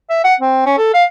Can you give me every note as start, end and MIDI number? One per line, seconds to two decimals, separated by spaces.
0.10 0.22 76
0.24 0.34 78
0.40 0.66 60
0.66 0.77 61
0.78 0.90 69
0.94 1.03 77